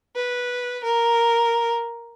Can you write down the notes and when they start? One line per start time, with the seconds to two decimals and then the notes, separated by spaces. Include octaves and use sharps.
0.15 B4
0.83 A#4